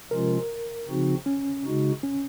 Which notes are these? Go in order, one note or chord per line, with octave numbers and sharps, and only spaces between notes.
C3 F3 G#3 C#4 F4 A#4
C#3 F3 C4 D#4 F#4
C#4
C#3 G#3 D#4 F#4
C#4